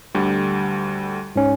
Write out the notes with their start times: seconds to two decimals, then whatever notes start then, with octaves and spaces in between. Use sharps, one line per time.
0.14 D2 D3 G3
1.36 G#2 C#4